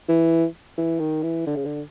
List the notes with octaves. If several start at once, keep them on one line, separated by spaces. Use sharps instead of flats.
E3
E3
D#3
E3
D3
C#3
D3